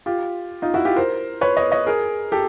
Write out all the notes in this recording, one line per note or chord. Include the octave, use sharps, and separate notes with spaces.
F4 G4
D#4 F4
E4 F#4
F4 G4
A#4 C5
B4 C#5
C#5 D#5
C#5 D#5
G#4 A#4
G4 A4